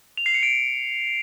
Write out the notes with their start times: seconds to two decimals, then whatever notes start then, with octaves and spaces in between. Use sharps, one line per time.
0.17 F7
0.26 C7
0.34 C#7
0.43 D7